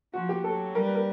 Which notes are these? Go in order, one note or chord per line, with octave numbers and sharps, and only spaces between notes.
F3 F#4
G4
F#3 A4
G3 A#4
B4
A#4